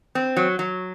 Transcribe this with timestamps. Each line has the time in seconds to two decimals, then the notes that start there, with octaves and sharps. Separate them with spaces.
0.15 C4
0.37 F#3
0.59 F#3